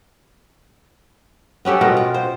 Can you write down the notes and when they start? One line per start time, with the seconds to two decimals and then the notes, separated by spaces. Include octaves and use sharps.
1.65 B3 C#4 G4 A4
1.81 B2 B3 F4 A#4
1.97 F4
2.14 C5